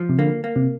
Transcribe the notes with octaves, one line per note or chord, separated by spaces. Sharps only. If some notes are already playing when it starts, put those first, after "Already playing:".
Already playing: F3
C3
D3 A#3
A#3
C3